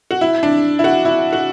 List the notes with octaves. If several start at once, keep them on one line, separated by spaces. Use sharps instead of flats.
F#4
E4
D4
E4
F#4
E4
F#4